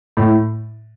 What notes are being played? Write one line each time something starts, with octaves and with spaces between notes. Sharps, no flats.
A2